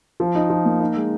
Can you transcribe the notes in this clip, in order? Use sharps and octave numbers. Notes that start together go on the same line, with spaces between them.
F3
D#4
F3
A#3
D#4
G#3